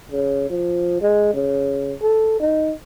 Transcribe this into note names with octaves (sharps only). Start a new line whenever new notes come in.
C#3
F3
G#3
C#3
A4
D#4